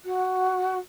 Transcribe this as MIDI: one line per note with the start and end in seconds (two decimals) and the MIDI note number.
0.05 0.78 66